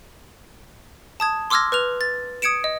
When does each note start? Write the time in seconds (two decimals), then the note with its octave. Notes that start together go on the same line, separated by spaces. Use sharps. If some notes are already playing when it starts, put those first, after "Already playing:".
1.20 A5 D#6 G#6
1.50 C6 D6 E6 F6 G#6 A#6
1.72 B4 F6 F7
2.01 A6
2.42 D#6 G#6 C#7 D7 E7
2.64 D#5